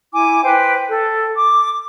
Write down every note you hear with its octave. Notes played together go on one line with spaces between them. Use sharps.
E4 G#5 D6
B4 C5 G5
A4
D6